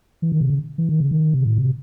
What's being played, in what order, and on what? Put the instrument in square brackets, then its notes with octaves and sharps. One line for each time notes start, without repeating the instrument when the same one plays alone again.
[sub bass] E3
D#3
C3
C#3
E3
D#3
C#3
D#3
C3
A2
C3